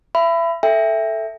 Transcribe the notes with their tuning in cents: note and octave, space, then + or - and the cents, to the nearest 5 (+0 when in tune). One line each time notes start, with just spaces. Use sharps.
E5 +30 B5 +20
A4 +0 E5 +0 G5 +30